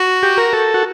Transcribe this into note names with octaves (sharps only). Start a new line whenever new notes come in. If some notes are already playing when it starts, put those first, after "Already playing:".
Already playing: F#4
G4
A#4
A4
F#4